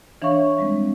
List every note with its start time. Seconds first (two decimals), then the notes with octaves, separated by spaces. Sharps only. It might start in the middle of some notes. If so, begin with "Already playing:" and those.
0.22 E3 D4 C#5 E5 F5 C#6
0.58 G3 G#3 C4